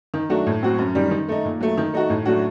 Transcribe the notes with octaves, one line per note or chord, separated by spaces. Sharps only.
D#3
F#3 A3 D4 F#4
A2
F#3 C4 F#4
F#2
D#3 G3
D#3
A3 D#4
A#2
F#3 A3
D#3
A3 D#4 F#4
A2
F#3 A3 D4 F#4